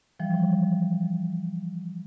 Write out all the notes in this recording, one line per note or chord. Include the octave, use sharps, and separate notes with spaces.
E3 F3 G3